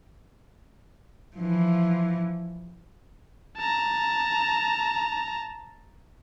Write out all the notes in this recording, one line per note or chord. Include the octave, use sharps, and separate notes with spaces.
E3 F3
A5 A#5